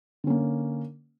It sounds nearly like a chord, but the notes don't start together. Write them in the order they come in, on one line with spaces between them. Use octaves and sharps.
D3 C#4 A#3